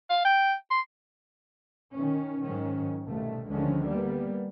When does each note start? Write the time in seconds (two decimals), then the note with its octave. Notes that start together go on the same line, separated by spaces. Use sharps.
0.10 F5
0.25 G5
0.71 C6
1.91 D#3 C#4
2.42 G#2 D#3 F#3 C#4
3.05 C2 B2 D#3 A3
3.48 D2 D3 D#3 F3 G#3 C#4
3.84 G3 A#3 B3